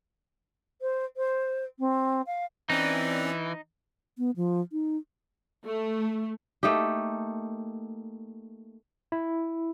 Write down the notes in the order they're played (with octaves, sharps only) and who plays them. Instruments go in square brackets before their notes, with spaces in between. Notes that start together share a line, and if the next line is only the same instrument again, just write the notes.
[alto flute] C5
C5
C4
F5
[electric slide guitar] E3 [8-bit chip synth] C4 C#4 D5 [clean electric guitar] D#4
[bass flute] B3
F3
D#4
[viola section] A3
[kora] A3 A#3 D#4 G4
[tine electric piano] E4